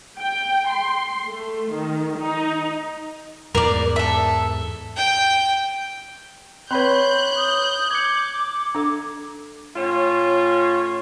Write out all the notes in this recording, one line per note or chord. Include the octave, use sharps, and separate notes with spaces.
G5
C6
A3
D#3
D#4
E2 G#2 A#4 D5
A4 E5
G5
C4 B4 C#5 B5 C6 F#6 G6
D#6
D6 G#6 C#7
D4 A4
A2 C#4 F4 C#5